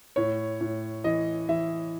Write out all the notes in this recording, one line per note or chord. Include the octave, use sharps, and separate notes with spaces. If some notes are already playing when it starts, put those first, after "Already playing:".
A2 C#5
A2
E3 D#5
E3 E5